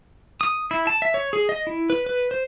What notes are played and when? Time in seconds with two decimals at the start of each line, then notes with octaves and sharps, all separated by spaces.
0.41 D#6
0.71 E4
0.87 A5
1.02 E5
1.14 C#5
1.33 G#4
1.49 D#5
1.67 E4
1.90 B4
2.06 B4
2.31 C5